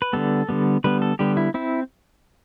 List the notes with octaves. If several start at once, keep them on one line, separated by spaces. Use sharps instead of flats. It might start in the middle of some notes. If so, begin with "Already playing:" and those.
B4
D3 G3 B3 A4
D3 G3 B3
D3 G3 B3 B4
A4
D3 G3 B3 G4
E4
C4 E4